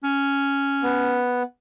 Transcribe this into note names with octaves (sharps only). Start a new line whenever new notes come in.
C#4
B3